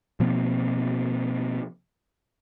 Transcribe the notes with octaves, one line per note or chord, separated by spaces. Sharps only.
B2 F3 A#3 C4